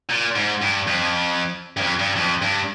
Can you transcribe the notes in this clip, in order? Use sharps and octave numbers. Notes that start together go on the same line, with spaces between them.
A#2
G#2
G2
F2
G2
F2
G2
F2
G2